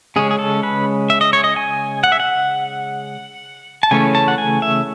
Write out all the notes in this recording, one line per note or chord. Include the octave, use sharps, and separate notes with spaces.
C#3 G#3 C#4 G#4
G#4
A4
B4
E5
D#5
C#5
D#5
G#5
F#5
E5
F#5
A5
C#3 E3 A3 C#4 G#5
A5
F#5
G#5
E5